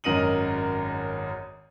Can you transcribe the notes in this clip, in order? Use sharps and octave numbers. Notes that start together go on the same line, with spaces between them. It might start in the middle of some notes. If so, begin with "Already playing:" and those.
G#1 F#2 A#4 D#5 D#7 F#7